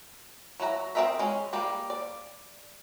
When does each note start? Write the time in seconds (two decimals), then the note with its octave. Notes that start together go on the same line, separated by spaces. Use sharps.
0.60 F#3 E4 F#4 A#5
0.95 C4 F#4 A#4 D#5 E5
1.19 G#3 C#4
1.53 G3 A#3 G4 D5
1.90 D5